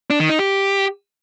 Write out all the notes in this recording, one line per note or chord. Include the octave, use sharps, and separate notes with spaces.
D4
D#3
D#4
G4